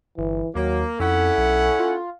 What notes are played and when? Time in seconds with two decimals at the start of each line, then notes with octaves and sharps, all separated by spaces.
0.18 G1 E3
0.55 D#2 F#3 A#3
1.00 F2 C#4 E4 A4 F#5
1.38 B1
1.79 F4